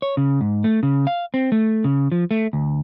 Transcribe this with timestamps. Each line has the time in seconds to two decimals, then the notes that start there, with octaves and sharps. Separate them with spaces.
0.02 C#5
0.17 C#3
0.41 G#2
0.64 A3
0.83 C#3
1.07 F5
1.34 C4
1.52 A3
1.84 C#3
2.12 F3
2.31 A3
2.53 D2